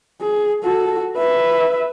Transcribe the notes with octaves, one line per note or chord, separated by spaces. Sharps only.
G#4
F#4 A4
B4 E5